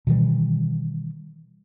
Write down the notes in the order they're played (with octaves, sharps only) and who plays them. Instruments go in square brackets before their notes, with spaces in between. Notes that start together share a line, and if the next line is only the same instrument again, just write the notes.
[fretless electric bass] B2 D#3 E3 G3